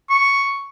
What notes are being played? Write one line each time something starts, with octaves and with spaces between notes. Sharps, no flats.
C#6